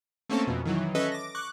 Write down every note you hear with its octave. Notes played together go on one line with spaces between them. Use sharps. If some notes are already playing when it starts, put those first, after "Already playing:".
A3 A#3 C4 C#4 A4 A5
F2 B2
D#3 E3 F#3
C#4 A4 B4 D#5 E5
D6 A#6
C#6 D6 F#6